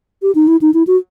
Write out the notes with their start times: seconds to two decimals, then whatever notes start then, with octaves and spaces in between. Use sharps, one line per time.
0.22 G4
0.35 D#4
0.48 E4
0.62 D#4
0.74 E4
0.87 F#4